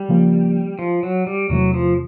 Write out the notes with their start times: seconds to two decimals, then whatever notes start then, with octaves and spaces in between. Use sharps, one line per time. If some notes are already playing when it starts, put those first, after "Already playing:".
Already playing: G3
0.09 C#3 F3 A#3
0.79 F3
1.03 F#3
1.27 G3
1.49 E2 C3 E3 F#3 A3
1.74 F3